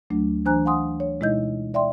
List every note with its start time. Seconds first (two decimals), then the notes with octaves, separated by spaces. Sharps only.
0.10 D2 F#3 A3 D4
0.45 E3 D4 C5 G#5 A#5 F#6
0.65 F5 F#5 G#5 C6 D#6
1.00 C#5
1.20 B2 G#3 D#4 E4 D#5 G6
1.74 D5 E5 G5 C6